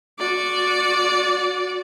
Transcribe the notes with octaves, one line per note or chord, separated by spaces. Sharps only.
F#4 D5